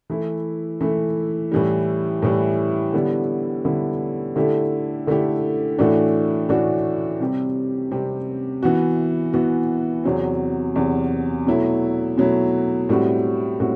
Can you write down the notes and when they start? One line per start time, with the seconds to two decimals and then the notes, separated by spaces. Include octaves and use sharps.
0.10 E3 A3 E4
0.81 E3 A3 E4
1.52 A2 E3 G3
2.22 A2 E3 G3
2.93 D3 G3 B3 E4
3.64 D3 G3 B3 E4
4.36 D3 A3 E4 G4
5.07 D3 A3 E4 G4
5.78 A2 E3 A3 D4 F#4
6.49 A2 E3 A3 D4 F#4
7.20 C3 G3 C4 G4
7.91 C3 G3 C4 G4
8.63 E3 B3 F#4
9.33 E3 B3 F#4
10.04 E2 C3 F#3 C4
10.76 E2 C3 F#3 C4
11.47 B2 F#3 A3 E4
12.18 B2 F#3 A3 E4
12.89 A2 G3 C4 F#4
13.60 A2 G3 C4 F#4